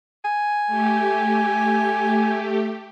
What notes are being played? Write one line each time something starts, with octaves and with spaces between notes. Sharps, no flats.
G#5
A3 G4